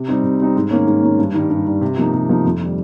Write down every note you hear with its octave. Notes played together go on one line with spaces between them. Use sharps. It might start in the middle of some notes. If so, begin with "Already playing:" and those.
Already playing: C3
G3 C4 D#4
C3
G3 C4 D#4
G#2
D#3 A#3 C#4
G#2
D#3 A#3 C#4
G2
D#3 G3
G2
D#3 G3
C3
F3 A#3 D#4
C3
F3 A#3 D#4
F2
D#3 G3